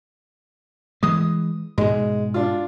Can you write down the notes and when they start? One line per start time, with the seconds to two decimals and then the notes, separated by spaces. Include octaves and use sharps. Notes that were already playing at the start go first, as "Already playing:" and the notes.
1.03 E3 G#3 D#6
1.78 G#2 B2 G#3
2.34 D4 F4